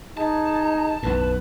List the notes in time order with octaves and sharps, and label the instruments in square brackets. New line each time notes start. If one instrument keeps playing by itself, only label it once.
[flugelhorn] D#4 [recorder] G#4 [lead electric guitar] A5
[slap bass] B1 F#2 A2 [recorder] B4